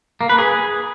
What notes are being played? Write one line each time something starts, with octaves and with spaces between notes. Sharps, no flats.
A#3
B4
G#4